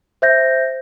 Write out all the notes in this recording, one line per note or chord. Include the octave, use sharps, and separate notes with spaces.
C5 E5 G6 A#6